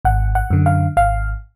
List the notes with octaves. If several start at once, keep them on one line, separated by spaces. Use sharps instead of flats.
G#1 F#5
F#5
F#2 D3
F5
G#1 F5